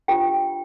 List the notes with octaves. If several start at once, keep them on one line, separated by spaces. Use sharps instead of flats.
D4 F4 G4 C5 G5